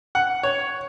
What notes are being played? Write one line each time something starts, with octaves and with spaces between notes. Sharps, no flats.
F#5
C#5